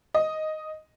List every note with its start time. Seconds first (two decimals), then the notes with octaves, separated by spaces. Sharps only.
0.14 D#5